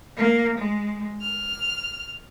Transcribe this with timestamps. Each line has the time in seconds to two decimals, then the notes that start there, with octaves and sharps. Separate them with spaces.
0.17 A#3
0.57 G#3
1.22 F6